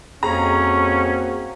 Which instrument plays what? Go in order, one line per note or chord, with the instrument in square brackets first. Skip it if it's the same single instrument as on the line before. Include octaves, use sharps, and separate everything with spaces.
[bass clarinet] F2 [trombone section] A#3 C4 F#4 [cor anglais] C#4 [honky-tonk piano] G#4 A#5